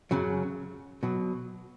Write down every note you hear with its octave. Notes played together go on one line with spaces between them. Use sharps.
F#2 C#3 F#3
B2 F#3